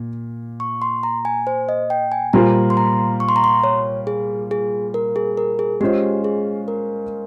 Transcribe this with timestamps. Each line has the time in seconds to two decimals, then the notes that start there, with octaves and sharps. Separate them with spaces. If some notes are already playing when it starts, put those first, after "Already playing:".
Already playing: A#2
0.60 C#6
0.82 C6
1.03 A#5
1.25 G#5
1.47 C5
1.69 D#5
1.90 G5
2.12 G#5
2.33 A#2 G3 A#3 F4 C5 A#5
2.70 C6
2.77 A#5
3.20 C#6
3.29 C6
3.36 A#5
3.44 C6
3.64 C#5
4.07 G#4
4.51 G#4
4.94 A#4
5.16 G#4
5.37 A#4
5.59 G#4
5.81 G#3 C#4 F4 G4 C5 D#5
6.24 G#4
6.68 A#4